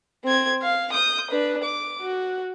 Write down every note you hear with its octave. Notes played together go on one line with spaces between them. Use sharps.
C4 G#6
F5
D#6 G6
D4 B4
D6
F#4